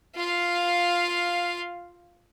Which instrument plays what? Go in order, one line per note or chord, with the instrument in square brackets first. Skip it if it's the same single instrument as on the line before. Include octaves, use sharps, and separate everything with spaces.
[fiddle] F4 F5